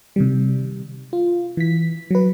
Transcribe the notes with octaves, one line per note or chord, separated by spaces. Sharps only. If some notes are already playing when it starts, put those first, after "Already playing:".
C3 D#3 G3
F4
E3 B6
F#3 B4